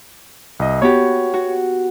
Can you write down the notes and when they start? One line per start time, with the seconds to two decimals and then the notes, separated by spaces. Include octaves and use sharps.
0.60 C2 D#5
0.82 B3 F#4 G4 C#5
1.34 F#4